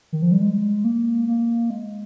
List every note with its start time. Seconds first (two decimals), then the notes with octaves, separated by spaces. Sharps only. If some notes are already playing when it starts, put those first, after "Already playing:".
0.13 D#3
0.22 F3
0.32 G3
0.41 G#3
0.84 A#3
1.28 A#3
1.70 G#3